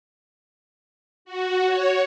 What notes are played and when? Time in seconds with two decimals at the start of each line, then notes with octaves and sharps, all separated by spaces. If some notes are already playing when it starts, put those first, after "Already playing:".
1.25 F#4
1.66 C#5